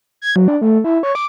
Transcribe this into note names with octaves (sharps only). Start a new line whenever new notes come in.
G#6
F#3
D4
A3
E4
C#5
D6